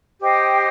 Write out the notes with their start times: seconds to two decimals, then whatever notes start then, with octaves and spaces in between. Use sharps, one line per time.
0.20 G4 C5 D#5 G5